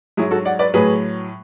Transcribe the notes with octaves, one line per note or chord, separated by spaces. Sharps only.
G#2 F#3 E4 G#4
F#4 A4
D5 F#5
B4 D5
A2 F#3 G#4 B4